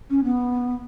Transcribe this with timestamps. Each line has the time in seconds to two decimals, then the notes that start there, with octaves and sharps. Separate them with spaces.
0.10 C#4
0.24 B3